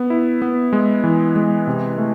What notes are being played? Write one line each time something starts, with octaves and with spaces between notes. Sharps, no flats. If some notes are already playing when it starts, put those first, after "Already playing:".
Already playing: B3
E4
B3
G#3
E3
G#3
C3
A3